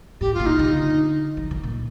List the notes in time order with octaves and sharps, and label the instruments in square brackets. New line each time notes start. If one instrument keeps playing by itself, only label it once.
[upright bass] A2 [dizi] G4
[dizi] F4
[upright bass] A#2
[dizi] D#4
[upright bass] D3
F3
D#3
A#2